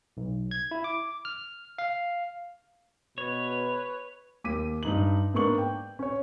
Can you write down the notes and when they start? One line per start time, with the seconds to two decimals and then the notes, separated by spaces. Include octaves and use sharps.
0.17 B1
0.51 G#6
0.71 E4
0.84 D6
1.25 F6
1.78 F5
3.18 B2 B4 C#5
4.44 D#2 D6 B6 D#7
4.83 G2 D#4 F#7
5.34 G#2 A#3 B3 D4 C#6 F#7
5.58 G5
5.99 C#4 C#5